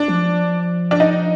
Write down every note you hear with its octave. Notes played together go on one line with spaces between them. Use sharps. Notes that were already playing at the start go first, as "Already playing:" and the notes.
Already playing: D4
F3
D4
D#4